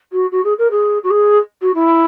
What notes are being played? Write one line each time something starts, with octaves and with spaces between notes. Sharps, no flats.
F#4
F#4
G#4
A#4
G#4
F#4
G#4
F#4
E4